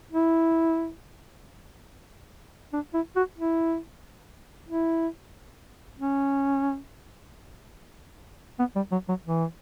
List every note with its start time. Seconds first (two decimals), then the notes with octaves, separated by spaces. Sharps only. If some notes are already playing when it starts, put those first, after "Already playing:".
0.12 E4
2.73 D4
2.94 E4
3.16 F#4
3.38 E4
4.68 E4
5.99 C#4
8.59 B3
8.76 G3
8.92 F#3
9.09 F#3
9.25 E3